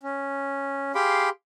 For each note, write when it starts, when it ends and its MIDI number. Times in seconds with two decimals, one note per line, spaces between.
0.03 0.92 61
0.95 1.29 67
0.95 1.29 68
0.95 1.29 77
0.95 1.29 83
0.95 1.29 84
0.95 1.29 86